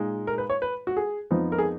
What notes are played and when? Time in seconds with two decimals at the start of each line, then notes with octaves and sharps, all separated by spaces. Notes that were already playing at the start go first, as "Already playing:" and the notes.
Already playing: A#2 G#3 D#4
0.27 A#4
0.38 B4
0.50 C#5
0.62 B4
0.87 F#4
0.97 G#4
1.31 F2 F3 B3 D#4
1.52 A#4
1.58 G#4